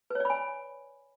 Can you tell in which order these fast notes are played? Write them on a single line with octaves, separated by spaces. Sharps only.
B4 C#5 D5 B5 G#5